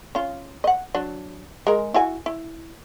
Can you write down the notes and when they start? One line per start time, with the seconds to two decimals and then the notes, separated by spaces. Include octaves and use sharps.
0.15 C#4 F4
0.64 D#5 F#5
0.95 F#3 D4
1.67 G#3 A#4
1.94 E4 F#4 G#5
2.26 E4